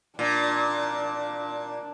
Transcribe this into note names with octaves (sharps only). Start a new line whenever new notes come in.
A#2 D4